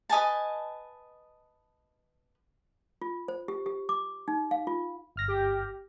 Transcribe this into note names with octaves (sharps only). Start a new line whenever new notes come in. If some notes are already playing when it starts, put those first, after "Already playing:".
B4 D#5 G#5 A5
F4
C5
G4
G4
D6
D#4
F5
F4
G1 F6 A#6
G4